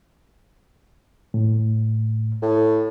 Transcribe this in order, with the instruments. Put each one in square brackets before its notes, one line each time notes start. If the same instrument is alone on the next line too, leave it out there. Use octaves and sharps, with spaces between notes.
[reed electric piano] A2
[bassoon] A2